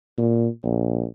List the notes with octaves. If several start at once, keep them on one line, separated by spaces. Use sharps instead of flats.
A#2
A#1